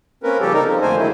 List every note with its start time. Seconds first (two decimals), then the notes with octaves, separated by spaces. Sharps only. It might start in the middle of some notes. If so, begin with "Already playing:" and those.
0.23 A#3 C4 C#4 A#4 B4
0.41 C#3 F3 G3 A#3 G4 A4
0.53 D#4 A#4
0.67 F3 A#3 C4
0.82 F2 D3 A3 A#3 C5 G#5
0.98 D#3 F#3 G#3 E4